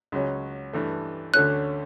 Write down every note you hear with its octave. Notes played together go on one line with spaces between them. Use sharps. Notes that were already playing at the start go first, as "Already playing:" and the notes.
C#2 C#3 F#3 C#4
G2 E3 A3
D2 D3 A3 C#4 F#6